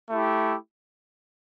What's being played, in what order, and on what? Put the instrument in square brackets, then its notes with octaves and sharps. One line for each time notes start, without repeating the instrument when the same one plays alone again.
[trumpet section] A3 E4 G4